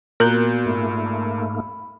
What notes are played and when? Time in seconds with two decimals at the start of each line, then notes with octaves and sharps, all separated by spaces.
0.20 A#2 B3 F#4 A#4 F#6 G6
0.66 G#2 A3 A#3 B5